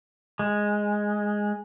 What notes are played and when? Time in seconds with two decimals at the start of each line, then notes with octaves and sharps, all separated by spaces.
0.39 G#3